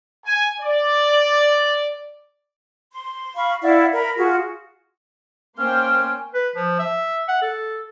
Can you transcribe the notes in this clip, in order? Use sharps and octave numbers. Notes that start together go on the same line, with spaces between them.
G#5
D5
C6
F5 B5 C#6
E4 D5 F5 F#5
A#4 B5
F4 F#4 G#4
A#3 C#4 C5 F5 G5
B4
F3
E5
F#5
A4